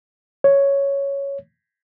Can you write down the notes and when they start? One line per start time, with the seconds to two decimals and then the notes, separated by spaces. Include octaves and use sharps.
0.44 C#5